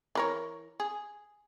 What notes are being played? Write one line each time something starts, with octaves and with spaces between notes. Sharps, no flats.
E3 A#4 C#5
G#4